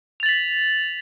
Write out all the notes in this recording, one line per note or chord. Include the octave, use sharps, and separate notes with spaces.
A6 B6 F7 F#7